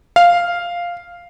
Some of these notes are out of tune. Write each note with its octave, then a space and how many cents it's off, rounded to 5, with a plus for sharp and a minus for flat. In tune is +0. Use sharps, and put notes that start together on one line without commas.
F5 +0